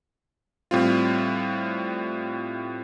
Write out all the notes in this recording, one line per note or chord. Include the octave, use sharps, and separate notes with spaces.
A2 G3 C4 F4